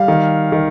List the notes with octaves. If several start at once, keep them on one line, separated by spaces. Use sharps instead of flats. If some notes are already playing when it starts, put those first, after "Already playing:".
Already playing: G3 F5
D#3
D#3